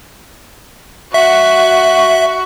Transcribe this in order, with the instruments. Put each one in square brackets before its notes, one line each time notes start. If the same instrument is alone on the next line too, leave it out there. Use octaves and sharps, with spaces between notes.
[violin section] F#4 C#6 [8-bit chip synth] E5